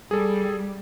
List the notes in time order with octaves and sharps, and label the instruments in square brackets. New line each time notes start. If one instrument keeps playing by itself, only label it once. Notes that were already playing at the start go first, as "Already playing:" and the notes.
[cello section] G3 [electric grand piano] G#4 A4